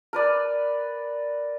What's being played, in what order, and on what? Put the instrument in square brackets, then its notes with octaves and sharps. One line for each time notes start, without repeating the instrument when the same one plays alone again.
[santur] A#4 B4 D5